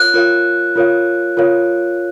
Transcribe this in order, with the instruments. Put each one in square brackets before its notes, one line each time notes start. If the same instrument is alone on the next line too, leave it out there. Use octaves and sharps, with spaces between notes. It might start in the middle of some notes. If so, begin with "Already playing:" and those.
Already playing: [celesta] F4 A#4 C#5 F5 [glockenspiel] F#6
[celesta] F4 A#4 C#5 F5
F4 A#4 C#5 F5
F4 A#4 C#5 F5